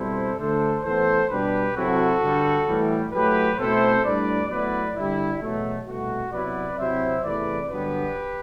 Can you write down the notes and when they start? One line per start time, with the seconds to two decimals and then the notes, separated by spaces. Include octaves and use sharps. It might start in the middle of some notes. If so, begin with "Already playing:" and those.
Already playing: B2 G3 C4 E4 A4 C5
0.38 D2 D3 A3 D4 A4 C5
0.83 A2 E3 B3 A4 C5
1.29 B2 G3 D4 G4 B4
1.75 C3 F#3 C4 E4 F#4 A4
2.21 G2 D3 G3
2.67 A2 E3 G3
3.12 A2 F#3 A3 G4 B4
3.58 B2 A3 C4 E4 A4 C5
4.03 A2 G3 D4 B4 D5
4.49 A2 F#3 B3 E4 B4 D5
4.95 G2 D3 G3 E4
5.41 E2 B2 F#3 A3
5.87 C2 B2 A3 F#4
6.32 C3 F#3 B3 E4 B4 D5
6.77 C3 F#3 C4 E4 C5 E5
7.23 E2 C3 E3 A3 B4 D5
7.69 G2 D3 F#3 B3 D4 G4 B4